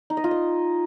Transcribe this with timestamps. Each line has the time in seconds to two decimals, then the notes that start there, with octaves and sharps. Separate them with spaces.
0.10 D#4
0.17 D#5
0.24 F4
0.31 D#5